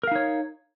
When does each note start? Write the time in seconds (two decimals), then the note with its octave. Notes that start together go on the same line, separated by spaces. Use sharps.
0.03 A#4
0.07 F5
0.11 D#4
0.15 C#5